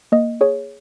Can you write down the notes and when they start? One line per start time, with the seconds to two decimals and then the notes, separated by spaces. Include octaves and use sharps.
0.12 A#3 D#5
0.41 G#4 C#5